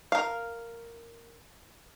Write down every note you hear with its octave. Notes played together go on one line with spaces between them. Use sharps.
A#4 F5